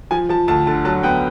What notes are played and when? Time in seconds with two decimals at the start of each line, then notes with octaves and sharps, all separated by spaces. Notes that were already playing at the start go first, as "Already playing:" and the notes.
0.11 F3 G#5
0.29 F3 A5
0.48 D2 A5
0.67 D3 A5
0.85 F#3 A5
1.03 B3 G5